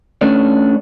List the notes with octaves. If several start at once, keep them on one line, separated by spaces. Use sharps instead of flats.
A3 C#4 D4